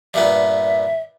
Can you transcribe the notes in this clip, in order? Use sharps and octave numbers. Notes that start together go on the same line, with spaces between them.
G2 A#2 B3 E5